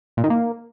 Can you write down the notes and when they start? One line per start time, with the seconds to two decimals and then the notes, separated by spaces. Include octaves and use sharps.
0.17 A#2
0.24 D#3
0.30 A#3